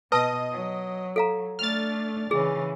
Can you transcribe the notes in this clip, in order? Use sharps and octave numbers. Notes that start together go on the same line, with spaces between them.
B2 B4 D#5 A5 D#6
F#3
A4 F5 A#5
A3 D4 F6 A6
C#3 E3 G#4